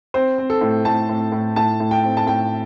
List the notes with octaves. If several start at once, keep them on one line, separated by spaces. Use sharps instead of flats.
C4 C5
C4
A4
A2
A2 A5
A2
A2
A2 A5
A2
G5
C4
A5
A2 G5